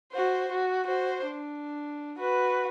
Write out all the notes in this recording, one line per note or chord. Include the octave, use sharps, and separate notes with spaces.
F#4 C5
F#4
F#4 C5
D4
F#4 B4